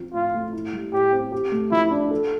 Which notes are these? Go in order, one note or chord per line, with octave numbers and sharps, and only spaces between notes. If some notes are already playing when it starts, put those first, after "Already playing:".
Already playing: F3 C4
A2 F4
A3
E4
G3
A2 G4
C4
G4
A3
F3 E4
D4
A4